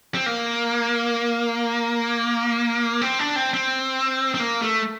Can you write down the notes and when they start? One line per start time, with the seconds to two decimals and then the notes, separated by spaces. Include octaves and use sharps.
0.15 C4
0.26 A#3
3.01 C4
3.19 D4
3.36 C4
3.54 C4
4.34 C4
4.40 A#3
4.62 A3